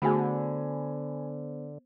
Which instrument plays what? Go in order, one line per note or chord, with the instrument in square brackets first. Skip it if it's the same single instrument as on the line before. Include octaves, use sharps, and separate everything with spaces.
[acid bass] D3 [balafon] A3 F#4 G#4 [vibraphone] B3 C5 [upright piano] G#5 B5